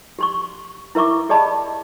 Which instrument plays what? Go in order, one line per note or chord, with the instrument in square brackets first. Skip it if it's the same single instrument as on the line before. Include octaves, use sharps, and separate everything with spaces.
[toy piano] G4 C6 C#6
E4 A#4 E5 C#6 D6
G4 G#4 D5 D#5 A5 B5